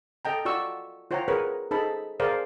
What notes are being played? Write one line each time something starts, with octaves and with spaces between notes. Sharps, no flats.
A4 D#5 G5 A#5
F4 F#4 D5 C#6 E6
F4 C5 C#5 F#5 G5 A#5
G#4 A#4 B4 C#5
D#4 G#4 A4 C5 A5 B5
G#4 A#4 C5 D5 F5